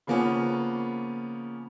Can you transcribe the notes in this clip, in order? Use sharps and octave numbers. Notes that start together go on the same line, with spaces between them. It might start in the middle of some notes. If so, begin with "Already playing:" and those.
C#3 F3 A#3 B3 C#4